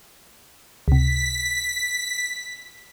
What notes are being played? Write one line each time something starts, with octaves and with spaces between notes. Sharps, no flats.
C#2 C3 B6